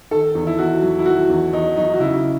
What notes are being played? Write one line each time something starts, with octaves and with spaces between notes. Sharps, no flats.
D#3 A4
E2
E4
E2 F#4
F#3
E4
D#3 F#4
E2
E2 D#4
F#3 D#4
F#4
C#3 E4